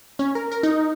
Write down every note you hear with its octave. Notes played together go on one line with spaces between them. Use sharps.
C#4
A#4
A#4
D#4